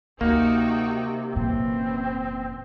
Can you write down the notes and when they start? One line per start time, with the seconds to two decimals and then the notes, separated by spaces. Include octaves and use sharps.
0.21 D2 C3 A#3 D#4 F#4 G5
1.35 F1 F#2 A#2 E3 C4